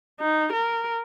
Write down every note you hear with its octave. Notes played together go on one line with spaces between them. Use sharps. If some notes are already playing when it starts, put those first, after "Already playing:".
D#4
A#4